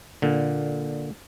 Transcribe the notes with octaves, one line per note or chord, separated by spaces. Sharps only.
A#2 D3